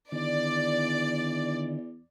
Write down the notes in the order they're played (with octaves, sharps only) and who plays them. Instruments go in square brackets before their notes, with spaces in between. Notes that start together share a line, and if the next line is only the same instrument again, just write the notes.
[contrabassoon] E2 [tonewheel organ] D3 D#3 [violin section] D5